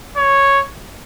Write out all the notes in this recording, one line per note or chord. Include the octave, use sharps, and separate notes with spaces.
C#5